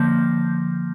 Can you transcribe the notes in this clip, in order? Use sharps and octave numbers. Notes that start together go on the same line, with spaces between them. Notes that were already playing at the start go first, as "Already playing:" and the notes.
Already playing: D3 F3 A#3 G6